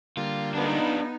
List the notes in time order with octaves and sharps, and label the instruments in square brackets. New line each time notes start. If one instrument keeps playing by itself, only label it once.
[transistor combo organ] D3 G3 A#3 [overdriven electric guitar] F4
[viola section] B3 D#4 [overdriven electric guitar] D4 F4